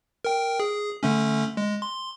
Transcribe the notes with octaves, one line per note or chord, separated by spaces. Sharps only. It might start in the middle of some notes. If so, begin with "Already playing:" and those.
A#4 G5
G#4
D3 A3 C#4
G#3
C6